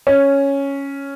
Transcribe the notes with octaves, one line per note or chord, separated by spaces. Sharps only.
C#4